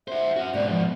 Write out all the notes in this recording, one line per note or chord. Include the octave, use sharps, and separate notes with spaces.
F#4 C5 E5
C#4 F#4
G#2 B2 D5
F3